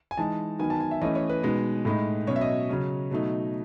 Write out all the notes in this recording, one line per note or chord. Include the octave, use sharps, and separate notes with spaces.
G#5
E3 G#3 D#4 A5
D#3 F#3 B3 D#4 G#5
A5
G#5
E5
E3 A3 C#4 D#5
C#5
B4
B2 G#3 D#4
A2 G#3 D#4
B2 F#3 C#4 C#5
E5
D#5
C#3 F#3 C#4
B2 F#3 A3 D#4